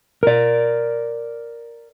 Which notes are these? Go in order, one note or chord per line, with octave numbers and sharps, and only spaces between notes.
A#4 D5